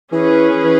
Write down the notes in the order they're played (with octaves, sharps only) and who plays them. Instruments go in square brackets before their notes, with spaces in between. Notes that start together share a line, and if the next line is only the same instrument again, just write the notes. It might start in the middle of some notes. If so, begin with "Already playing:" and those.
[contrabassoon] E3 [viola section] C#4 G#4 B4
[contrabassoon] E3